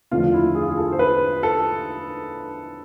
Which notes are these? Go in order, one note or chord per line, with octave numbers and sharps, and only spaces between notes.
E2 D3 F3 A3 F4
E4
G#4
F4
G#4
A4
C5
B4
A4